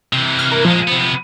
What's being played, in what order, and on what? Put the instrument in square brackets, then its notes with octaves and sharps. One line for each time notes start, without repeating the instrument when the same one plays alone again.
[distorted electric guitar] C3 E3
[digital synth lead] F6
A#4
[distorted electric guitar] A#2 G#3 [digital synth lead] F3
[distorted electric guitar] C3 B3